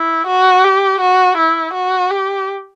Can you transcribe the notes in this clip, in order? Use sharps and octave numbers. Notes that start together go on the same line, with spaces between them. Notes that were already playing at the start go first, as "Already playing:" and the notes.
Already playing: E4
F#4
G4
F#4
E4
F#4
G4